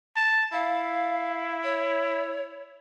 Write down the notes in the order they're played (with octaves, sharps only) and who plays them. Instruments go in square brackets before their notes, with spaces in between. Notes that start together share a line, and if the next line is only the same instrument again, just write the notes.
[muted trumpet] A5
[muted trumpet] E4 [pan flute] F5
[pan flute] C#5